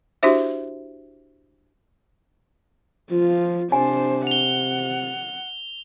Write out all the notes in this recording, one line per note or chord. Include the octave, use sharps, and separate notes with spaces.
D4 E4 F#4 G4 C5 E5
F3 F4
C3 D4 C5 G#5
F#5 F7 G7